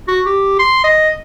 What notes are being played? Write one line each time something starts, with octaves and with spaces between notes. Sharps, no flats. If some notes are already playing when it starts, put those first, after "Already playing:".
F#4
G4
C6
D#5